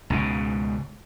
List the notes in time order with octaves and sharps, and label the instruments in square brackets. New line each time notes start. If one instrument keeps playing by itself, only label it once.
[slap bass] C#2 G#2 B2